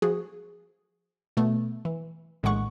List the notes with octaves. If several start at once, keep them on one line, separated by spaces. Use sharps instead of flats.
F3 F#4 G#4
B2 A3 B3
E3
A#1 A2 D#3 G#3 F#5 C#6